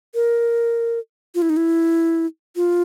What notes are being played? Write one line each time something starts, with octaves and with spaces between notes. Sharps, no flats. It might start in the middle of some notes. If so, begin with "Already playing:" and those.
A#4
F4
E4
D#4
E4
F4